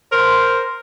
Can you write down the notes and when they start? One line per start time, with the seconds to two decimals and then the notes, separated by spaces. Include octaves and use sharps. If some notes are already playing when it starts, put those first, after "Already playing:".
0.12 A#4 C5